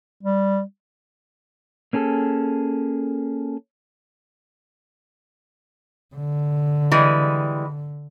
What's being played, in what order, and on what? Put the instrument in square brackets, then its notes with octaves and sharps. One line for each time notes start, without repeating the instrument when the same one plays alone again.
[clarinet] G3
[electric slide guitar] A#3 C#4 G#4 A4
[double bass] D3
[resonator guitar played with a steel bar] E3 G3 G#3